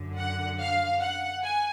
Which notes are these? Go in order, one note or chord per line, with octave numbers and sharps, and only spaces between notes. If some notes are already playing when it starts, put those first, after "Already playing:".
Already playing: F#2 D3
F#5
F5
F#5
G#5